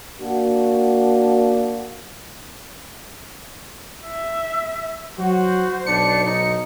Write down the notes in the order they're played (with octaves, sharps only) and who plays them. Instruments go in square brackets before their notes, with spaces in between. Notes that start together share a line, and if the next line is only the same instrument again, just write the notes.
[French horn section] A#3 D4 F#4
[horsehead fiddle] E5
[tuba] F#3 [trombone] F#4 [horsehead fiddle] C5
[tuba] B1 [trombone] D4 [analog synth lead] C#7
[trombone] D#4